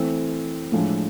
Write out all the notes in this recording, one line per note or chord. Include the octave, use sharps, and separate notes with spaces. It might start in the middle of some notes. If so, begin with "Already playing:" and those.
Already playing: E3 A3 C4
A2 F3 G#3 D4